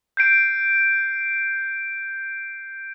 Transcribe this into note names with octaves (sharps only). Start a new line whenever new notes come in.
G6 C7 D7